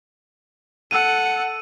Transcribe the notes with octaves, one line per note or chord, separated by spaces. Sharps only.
A4 F#5 E6 D#7